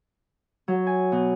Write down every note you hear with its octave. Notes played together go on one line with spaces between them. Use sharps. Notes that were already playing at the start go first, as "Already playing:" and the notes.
F#3
G#5
B2